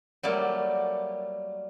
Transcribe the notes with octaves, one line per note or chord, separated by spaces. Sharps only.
F#3 G3 A3 A#3 D5